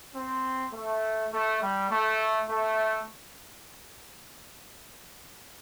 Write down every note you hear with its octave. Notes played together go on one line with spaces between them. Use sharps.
C4
A3
A3
G3
A3
A3